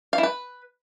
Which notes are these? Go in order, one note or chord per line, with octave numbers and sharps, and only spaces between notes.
F5
E4
B4